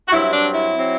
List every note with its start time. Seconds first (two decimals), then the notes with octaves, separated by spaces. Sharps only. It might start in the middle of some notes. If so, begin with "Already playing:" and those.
0.08 F#4
0.12 G2 F#3 C4 E4
0.33 D4
0.55 E4
0.77 F#3 C4